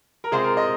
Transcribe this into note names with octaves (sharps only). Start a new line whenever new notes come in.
A#4
C3 G#3 C4 F4 G#4
A#4
D#5